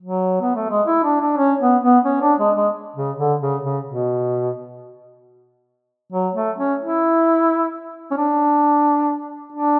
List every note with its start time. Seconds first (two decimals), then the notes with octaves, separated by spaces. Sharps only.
0.02 F#3
0.41 B3
0.56 A3
0.70 G#3
0.87 E4
1.04 D4
1.20 D4
1.37 C#4
1.61 B3
1.83 B3
2.05 C#4
2.22 D4
2.39 G#3
2.56 G#3
2.96 C#3
3.18 D3
3.41 C#3
3.64 C#3
3.86 B2
6.12 F#3
6.35 A3
6.58 C#4
6.80 E4
8.11 C#4
8.17 D4
9.53 D4